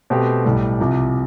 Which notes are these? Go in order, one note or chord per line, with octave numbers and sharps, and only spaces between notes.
B2 A3 C4 G4
B1 A2 G3
C2 C3 F3